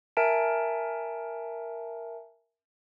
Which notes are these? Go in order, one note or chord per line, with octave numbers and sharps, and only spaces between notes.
A#4 E5 G#5 A5 D7